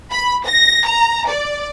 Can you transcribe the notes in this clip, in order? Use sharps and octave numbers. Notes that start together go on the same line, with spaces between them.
B5
A#6
A#5
D5